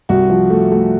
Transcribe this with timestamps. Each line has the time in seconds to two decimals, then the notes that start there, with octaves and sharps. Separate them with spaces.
0.09 C2 F#4
0.30 F3
0.50 A3
0.72 A3